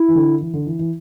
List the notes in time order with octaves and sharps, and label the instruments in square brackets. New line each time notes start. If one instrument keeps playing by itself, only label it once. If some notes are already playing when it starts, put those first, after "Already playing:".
Already playing: [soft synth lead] E4
[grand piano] E3
D3
E3
D3
E3
E3